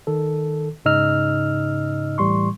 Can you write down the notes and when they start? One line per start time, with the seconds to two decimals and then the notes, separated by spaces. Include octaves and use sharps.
0.07 D#3 A4
0.85 G#2 C#3 D#4 D#5 E6 F6
2.18 A2 E3 G3 C6 C#6